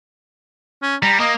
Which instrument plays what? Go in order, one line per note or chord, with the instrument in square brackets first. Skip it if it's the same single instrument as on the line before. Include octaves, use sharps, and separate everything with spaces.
[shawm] C#4
[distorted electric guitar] G3 [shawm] A#5
[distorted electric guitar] A#3 [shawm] D#5